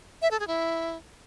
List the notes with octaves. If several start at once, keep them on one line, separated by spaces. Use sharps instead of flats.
E5
A4
G#4
E4